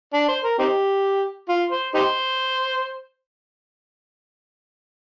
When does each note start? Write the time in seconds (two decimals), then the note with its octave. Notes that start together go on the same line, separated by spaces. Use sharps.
0.14 D4
0.28 C5
0.44 A#4
0.59 C4 D#4 G4
1.49 F4
1.72 C5
1.95 D#4 G4 C5